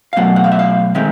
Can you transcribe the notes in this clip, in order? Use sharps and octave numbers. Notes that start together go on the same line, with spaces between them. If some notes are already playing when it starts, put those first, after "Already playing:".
F5
B2 F#3 A3 F#5
F#5
F5
E5
F5
D#3 G#3 C4 D#4 E5